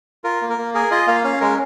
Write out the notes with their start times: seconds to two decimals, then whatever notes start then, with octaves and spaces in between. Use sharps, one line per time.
0.24 F4 A#4
0.41 A#3
0.50 A#4
0.58 A#3
0.74 G#4 A#4
0.91 F4 D#5
1.07 A#3 F5
1.24 C#4 F5
1.41 G#3 A#4